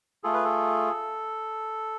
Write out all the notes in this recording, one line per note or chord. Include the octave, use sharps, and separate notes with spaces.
A3 F4 G#4 A4
B4
A4